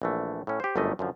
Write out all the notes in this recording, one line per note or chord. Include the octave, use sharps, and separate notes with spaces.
A#1 E3 A3
A2 C#4
G4 C5
G1 F#2 G3 A3 A#4 D#5
F#2 D3 F3